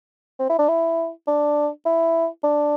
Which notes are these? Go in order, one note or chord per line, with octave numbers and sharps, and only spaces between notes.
C4
E4
D4
E4
D4
E4
D4